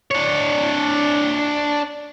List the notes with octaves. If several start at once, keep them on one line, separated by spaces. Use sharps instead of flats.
D4 C#5